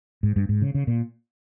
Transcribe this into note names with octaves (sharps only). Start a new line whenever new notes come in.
G#2
G2
G#2
C#3
C#3
A#2